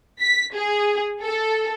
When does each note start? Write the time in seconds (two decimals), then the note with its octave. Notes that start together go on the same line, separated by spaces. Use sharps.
0.20 B6
0.54 G#4
1.21 A4